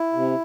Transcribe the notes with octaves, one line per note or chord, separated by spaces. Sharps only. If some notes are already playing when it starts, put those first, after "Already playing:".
Already playing: E4
C3